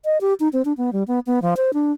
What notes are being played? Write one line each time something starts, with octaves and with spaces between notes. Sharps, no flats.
D#5
G4
D#4
C4
D4
B3
G3
B3
B3
F3
C5
D4